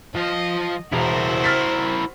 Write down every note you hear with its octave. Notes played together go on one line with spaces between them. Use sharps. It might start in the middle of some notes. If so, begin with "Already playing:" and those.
F3 D#5 F5
E1 E4 F#4 A#4 C5
F6 A6 B6